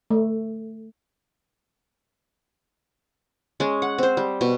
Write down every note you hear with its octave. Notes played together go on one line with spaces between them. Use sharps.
A3
G#3 C#4
F#5
C4 C5
G3
B2